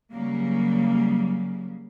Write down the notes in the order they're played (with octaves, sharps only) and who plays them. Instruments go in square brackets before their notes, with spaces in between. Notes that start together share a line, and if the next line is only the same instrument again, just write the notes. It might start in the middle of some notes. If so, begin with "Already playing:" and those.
[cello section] C#3 F#3 G3 A#3